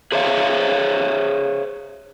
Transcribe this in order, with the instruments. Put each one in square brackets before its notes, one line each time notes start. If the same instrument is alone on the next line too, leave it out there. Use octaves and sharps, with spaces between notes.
[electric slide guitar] G#4 C5 C#5 E5 F5